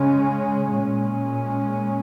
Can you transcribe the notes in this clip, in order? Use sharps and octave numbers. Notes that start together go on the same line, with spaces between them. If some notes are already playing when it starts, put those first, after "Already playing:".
Already playing: C#3 G#3 C#4
A#2 G#3 C#4